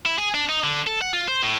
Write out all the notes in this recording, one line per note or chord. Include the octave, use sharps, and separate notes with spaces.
E4
G#4
D4
D#4
D3
A4
F#5
F4
C5
A2